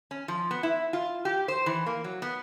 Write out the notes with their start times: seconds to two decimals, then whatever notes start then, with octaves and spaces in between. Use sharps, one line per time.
0.11 C#4
0.28 F3
0.51 B3
0.63 E4
0.93 F4
1.25 G4
1.48 C5
1.66 E3
1.86 A#3
2.04 F#3
2.22 B3